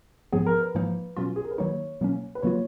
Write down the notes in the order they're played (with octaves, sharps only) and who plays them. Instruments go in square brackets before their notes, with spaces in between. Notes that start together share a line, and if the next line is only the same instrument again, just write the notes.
[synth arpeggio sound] G#2 F3 B3 [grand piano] G#4
[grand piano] A#4
B4
[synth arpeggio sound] G#2 F3 A#3 D#4
B2 F#3 C#4 F4
[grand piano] G#4
A#4
B4
[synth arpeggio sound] D#3 F#3 A#3 D#4 [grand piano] C#5
[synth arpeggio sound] B2 F#3 A#3 C#4
[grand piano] B4
[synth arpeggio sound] C#3 F#3 A#3 F4 [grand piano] C#5